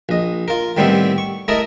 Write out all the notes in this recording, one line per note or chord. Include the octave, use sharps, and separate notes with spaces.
A#1 D#5
F4 A#4
A2 D#3 G3 B3 C4 E4
C#6
A3 E4 A#4 D#5 A5 D#6